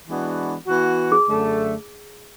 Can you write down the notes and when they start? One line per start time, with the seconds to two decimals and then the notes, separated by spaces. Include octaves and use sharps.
0.08 E3 G#3 B3 D4 F#4
0.67 E3 B3 F#4
1.12 G#4
1.27 F#2 D3 A3